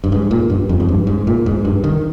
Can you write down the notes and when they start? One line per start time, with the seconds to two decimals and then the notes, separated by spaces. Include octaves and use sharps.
0.04 G2
0.12 G#2
0.31 A#2
0.50 G2
0.69 F2
0.80 G#2
0.89 G2
1.07 G#2
1.27 A#2
1.46 G#2
1.65 G2
1.84 D#3